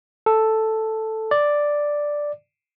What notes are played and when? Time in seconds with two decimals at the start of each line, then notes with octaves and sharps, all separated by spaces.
0.26 A4
1.31 D5